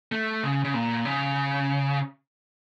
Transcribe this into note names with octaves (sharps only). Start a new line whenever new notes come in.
A3
C#3
C#3
A#2
C#3